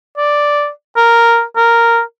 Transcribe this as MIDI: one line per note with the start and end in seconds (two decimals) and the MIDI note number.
0.17 0.69 74
0.96 1.43 70
1.56 2.01 70